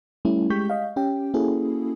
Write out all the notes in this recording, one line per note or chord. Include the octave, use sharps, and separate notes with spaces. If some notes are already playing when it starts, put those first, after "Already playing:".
G3 A3 C#4 E4
G#3 G4 C#6 G6 B6
D#5 F5
C#4 G4 G5
A#3 C#4 E4 F#4 G#4 A4